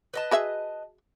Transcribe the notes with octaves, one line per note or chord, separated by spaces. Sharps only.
B4 D#5 A5
F#4 G#4 E5